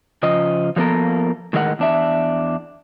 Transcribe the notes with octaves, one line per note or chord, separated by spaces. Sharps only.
C#3 F3 D#5
F3 F#3 A#3 B3 A4 A#4
A2 D#3 G#3 A#4 D#5 F#5
E2 D4 E5